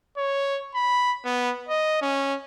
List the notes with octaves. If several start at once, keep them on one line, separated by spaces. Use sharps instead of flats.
C#5
B5
B3
D#5
C#4